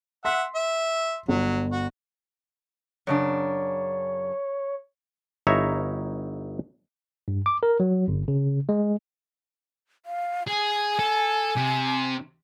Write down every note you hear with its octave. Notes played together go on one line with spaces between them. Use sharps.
E5 F#5 C6 B6
E5
G1 F#3
F#4
F#2 C#3 D4 C#5
G1 D#4 E4 C#5 E5 A#5
G2
D6
A#4
F#3
G1
C#3
G#3
F5
G#4 G#5
A4
C3